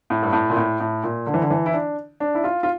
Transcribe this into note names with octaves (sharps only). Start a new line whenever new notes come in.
A2
G2
A2
A#2
A2
A2
A#2
D3
E3
D3
E3
E4
D4
D4
E4
F4
F4